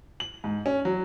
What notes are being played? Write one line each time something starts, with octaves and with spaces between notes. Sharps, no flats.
F#7
G#2
C#4
F#3